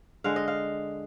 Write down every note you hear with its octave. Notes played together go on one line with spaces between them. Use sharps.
D3 G#3 F5
D#5
F5